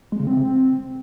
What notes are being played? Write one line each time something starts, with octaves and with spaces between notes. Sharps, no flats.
G#3
C#3
C4